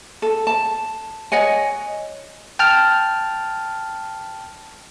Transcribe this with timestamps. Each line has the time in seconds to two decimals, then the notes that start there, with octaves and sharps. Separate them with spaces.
0.22 A4
0.47 A5
1.32 C#5 D#5 F#5 G#5
2.59 G5 A5 F6